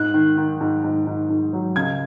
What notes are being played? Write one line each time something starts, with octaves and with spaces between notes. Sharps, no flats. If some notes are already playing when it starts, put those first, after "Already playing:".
Already playing: G#2 F#6
D#3
D#3
G#2
G#2
G#2
G#2
F#3
C#2 G#6